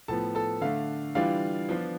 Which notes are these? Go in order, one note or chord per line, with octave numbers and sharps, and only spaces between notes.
A2 F3 B3 A4 A5
A4 A5
D3 A3 D4 F5
E3 G3 D4 F4 F5
F3 B3 D4 F4